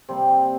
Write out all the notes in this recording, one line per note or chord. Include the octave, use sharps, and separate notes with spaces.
C3 G3 A#3 C4
C4